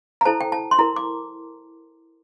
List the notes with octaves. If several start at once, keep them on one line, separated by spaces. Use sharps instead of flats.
A#5
E4 A4 C5 A5
G5
A5
C6
E4 A#4 A#5
D6